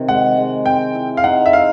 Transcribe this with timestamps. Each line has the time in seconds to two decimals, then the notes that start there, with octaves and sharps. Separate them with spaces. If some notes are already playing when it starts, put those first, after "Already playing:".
Already playing: C3 D#3
0.08 G#3 F#5
0.37 G#3
0.65 C4 G5
0.95 E4
1.17 F5
1.24 D#4 F#5
1.46 E5
1.53 D#4 F5